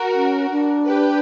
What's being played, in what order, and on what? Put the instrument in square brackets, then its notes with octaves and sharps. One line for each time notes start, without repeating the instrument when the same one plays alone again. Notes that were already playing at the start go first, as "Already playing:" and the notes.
Already playing: [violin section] F#4 A#4
[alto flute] C#4
D4
[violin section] G4 B4